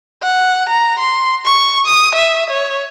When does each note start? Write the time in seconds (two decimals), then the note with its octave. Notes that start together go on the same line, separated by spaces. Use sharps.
0.23 F#5
0.69 A#5
0.99 C6
1.45 C#6
1.86 D#6
2.15 E5
2.50 C#5